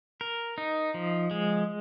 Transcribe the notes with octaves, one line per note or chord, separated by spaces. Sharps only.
A#4
D#4
F3
G#3